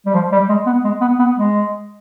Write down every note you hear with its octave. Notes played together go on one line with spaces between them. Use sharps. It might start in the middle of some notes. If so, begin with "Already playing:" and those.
G3
F3
G3
G#3
B3
G#3
B3
B3
G#3